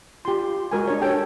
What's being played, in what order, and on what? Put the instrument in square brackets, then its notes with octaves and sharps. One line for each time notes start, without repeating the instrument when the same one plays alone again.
[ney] F4 [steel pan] G4 C6
[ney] G#3 [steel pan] F#4 A#4 G#5
[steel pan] D4 C#5
[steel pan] G4 A4 G5 [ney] C#5